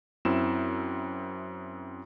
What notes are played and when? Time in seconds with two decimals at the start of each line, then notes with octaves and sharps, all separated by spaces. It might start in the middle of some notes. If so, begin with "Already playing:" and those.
0.25 F#2 C4 E4 E7